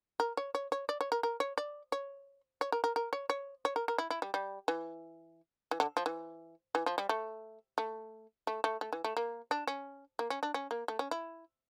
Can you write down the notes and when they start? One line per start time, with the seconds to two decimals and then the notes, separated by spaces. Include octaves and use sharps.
0.20 A#4
0.37 C#5
0.55 C#5
0.72 C#5
0.89 D5
1.01 C#5
1.12 A#4
1.23 A#4
1.40 C#5
1.58 D5
1.92 C#5
2.61 C#5
2.72 A#4
2.84 A#4
2.96 A#4
3.13 C#5
3.30 C#5
3.65 C#5
3.76 A#4
3.88 A#4
3.98 E4
4.10 E4
4.22 G3
4.34 G3
4.68 E3
5.71 E3
5.80 D3
5.97 F3
6.06 E3
6.75 E3
6.86 F3
6.98 G3
7.09 A3
7.78 A3
8.47 A3
8.64 A3
8.81 A3
8.93 E3
9.04 A3
9.17 A#3
9.51 D4
9.67 C#4
10.19 A#3
10.30 C#4
10.43 D4
10.54 C#4
10.71 A#3
10.88 A3
10.99 C#4
11.11 E4